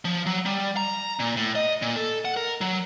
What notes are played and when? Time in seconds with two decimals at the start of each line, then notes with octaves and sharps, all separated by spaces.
0.05 F3
0.26 F#3
0.46 G3
0.77 A#5
1.20 A#2
1.37 A2
1.55 D#5
1.82 A#2
1.96 A4
2.25 F#5
2.37 A#4
2.61 F#3